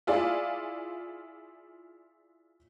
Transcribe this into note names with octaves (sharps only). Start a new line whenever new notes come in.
E4 F4 G#4 D5